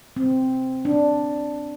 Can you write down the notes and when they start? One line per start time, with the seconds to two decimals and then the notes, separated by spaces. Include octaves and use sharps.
0.16 C4
0.85 D4